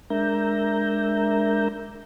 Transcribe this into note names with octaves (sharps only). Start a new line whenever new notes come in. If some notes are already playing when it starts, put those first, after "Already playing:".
G#3 D4 A#4 E5 A#5 G6